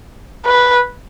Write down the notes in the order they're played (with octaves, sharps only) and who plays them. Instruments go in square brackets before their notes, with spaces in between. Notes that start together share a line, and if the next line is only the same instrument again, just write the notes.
[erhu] B4